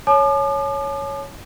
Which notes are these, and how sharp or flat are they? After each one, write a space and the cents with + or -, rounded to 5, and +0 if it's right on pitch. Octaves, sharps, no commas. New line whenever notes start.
C#5 +0 A5 -45 D6 +45